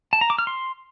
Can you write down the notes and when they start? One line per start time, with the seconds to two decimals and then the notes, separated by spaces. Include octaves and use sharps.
0.13 A5
0.21 A#5
0.30 D6
0.39 F6
0.47 C6